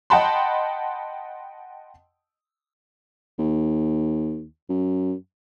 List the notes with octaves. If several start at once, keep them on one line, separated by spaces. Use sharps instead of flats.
D#5 F#5 G5 A5 B5 C6
D#2
F#2